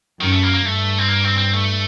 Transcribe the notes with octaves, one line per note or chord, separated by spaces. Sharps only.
F#2 D#3
A3
A#3
A#3
G2 A3
C4
A#3
C4
C4
A3